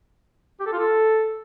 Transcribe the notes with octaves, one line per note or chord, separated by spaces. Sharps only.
G4
A4
F4
A4